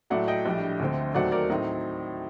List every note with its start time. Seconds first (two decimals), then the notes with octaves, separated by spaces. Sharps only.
0.10 A2 F#3 A3 D5 F#5
0.28 D#5 G5
0.46 A#1 A2 G3 D4
0.80 D2 D3 A3 C4
1.14 D#2 D#3 F#3 A3 C4 D5 F#5
1.32 A#4 D5
1.50 A2 F#3 C4 D#4